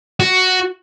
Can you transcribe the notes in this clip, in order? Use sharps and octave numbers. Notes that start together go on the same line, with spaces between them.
F#4